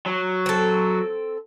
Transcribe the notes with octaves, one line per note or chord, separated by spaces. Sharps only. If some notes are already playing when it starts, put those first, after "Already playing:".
F#3
C4 A4